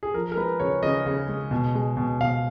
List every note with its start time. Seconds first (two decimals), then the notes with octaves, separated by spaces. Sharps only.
0.03 G#4
0.14 F3 A#4
0.32 A#4
0.37 G#3 B4
0.60 C#3 C#5
0.83 C#3 D#5
1.06 C#3
1.29 G#3
1.51 B2
1.75 G#3
1.97 B2
2.20 B2 F5